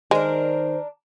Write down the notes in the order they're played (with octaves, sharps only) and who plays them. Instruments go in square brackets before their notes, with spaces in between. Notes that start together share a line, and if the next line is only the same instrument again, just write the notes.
[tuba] D#3 [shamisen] G#3 [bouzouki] D4 A#4 [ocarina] C5